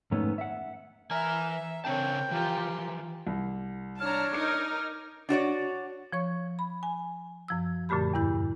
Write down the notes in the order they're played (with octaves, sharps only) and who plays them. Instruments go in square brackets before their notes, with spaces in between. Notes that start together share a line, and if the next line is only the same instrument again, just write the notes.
[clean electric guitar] F2 G#2 D#3 A3 B3 C#4
E5 F#5
[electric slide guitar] E3 G#5 [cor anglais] A#4 [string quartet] E5
[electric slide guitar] C#3 D4 A5 [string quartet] C4 A#4 C#5 [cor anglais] G5
[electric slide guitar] E3 F3 [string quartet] F4 G4 A#4
[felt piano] C2
[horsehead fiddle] D4 C#5 [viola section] A5 A#5 [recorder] F6
[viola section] D#4 A#4 [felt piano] D6 C#7
[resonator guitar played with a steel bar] D4 F#4 C#5 D5
[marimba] F3 C#5 C#6
B5
G#5
F#2 F3 E6
F#2 A#2 D3 A3 G4 B5
E2 G2 E4 G6